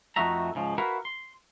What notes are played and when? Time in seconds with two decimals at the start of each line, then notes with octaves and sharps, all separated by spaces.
0.16 F2 A3 D#4 F#4 E5 A#5
0.55 G#2 C#3 F3
0.78 E4 F#4 A#4 B4 F5
1.05 C6